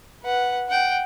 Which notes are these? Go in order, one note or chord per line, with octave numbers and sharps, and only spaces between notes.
B4 F#5
F#5 G5